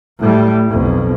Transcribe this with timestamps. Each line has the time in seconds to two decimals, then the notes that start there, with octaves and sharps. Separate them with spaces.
0.19 A2 G3
0.70 B1 F2